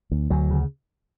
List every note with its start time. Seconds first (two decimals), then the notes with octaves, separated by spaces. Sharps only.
0.11 D2
0.30 D2 F#3
0.50 C#3